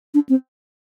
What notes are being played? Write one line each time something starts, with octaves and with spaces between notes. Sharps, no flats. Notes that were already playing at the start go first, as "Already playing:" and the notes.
D4
C4